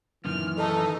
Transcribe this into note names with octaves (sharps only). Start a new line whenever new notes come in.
F#2 A#2 D#3 E3 F6
D#4 A4